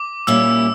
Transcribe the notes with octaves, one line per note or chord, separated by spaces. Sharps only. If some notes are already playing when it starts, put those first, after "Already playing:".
Already playing: D6
A#2 G3 A#3 C#4 E4 E6